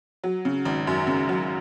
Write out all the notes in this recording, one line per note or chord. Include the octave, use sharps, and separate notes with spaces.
F#3
C#3
G#1
F#2
C#3
F#3